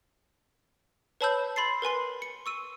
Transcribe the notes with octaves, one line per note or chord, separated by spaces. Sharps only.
B4 C#5 A5 B5 E6 G6
B5 C6 A6 C7
A#4 B4 G#5 C6
C#7
C#6 E6 D#7